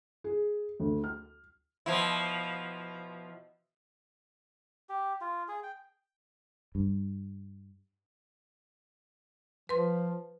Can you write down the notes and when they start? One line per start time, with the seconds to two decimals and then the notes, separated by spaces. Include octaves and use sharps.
0.24 G#4
0.80 D2
1.04 F6
1.86 B2 F3 E4
4.89 G4
5.21 F4
5.48 G#4
5.63 G5
6.75 G2
9.69 F3 B4 C6